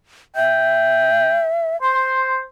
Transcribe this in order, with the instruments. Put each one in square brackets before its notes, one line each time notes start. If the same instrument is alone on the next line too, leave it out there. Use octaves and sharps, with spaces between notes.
[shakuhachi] E5 [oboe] G5
[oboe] C5 [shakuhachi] C6